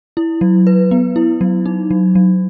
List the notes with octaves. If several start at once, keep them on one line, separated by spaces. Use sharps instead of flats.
E4
F#3
B4
B3
E4
F#3
D#4
F#3
F#3